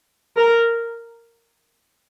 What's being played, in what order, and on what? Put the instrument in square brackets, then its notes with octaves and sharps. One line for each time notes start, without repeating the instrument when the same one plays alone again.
[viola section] A#4